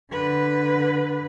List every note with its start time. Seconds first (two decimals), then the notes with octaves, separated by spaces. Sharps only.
0.12 D3 B4